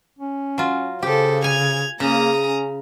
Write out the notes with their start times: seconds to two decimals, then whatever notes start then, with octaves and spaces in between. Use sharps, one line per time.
0.19 C#4
0.58 F#3 F4
1.03 C#3 G4 A4 C5
1.44 G#5 G#6 F7
2.00 C#3 A#3 A#5 D#6
2.43 C#4